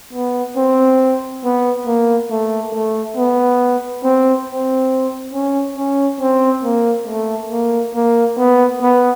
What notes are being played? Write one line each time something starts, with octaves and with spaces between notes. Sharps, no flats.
B3
C4
B3
A#3
A3
A3
B3
C4
C4
C#4
C#4
C4
A#3
A3
A#3
A#3
B3
B3